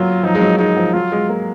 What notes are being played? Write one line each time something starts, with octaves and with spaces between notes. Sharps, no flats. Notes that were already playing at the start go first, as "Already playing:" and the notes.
Already playing: F#3 A#3 F4
F3 D#4
G#3
F#3
G#3 D#4
F3
F#3 F4
G#3
A#3